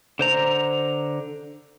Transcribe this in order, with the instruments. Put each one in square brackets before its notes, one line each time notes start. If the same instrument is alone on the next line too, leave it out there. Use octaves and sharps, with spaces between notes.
[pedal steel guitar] D3 C5 A#5